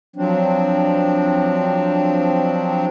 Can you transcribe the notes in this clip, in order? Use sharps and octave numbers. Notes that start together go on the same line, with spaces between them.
F3 F#3 C4 D4